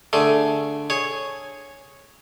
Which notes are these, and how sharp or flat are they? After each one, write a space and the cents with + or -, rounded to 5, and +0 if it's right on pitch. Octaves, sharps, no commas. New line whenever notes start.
D3 +0 A3 +0 G#4 +15
G#4 +5 C#5 -5